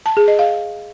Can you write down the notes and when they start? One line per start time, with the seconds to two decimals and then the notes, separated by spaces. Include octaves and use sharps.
0.06 A5
0.17 G#4
0.28 D#5
0.39 F5